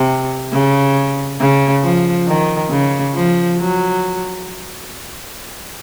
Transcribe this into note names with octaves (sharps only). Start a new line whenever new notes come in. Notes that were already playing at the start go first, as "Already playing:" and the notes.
Already playing: C3
C#3
C#3
F3
D#3
C#3
F3
F#3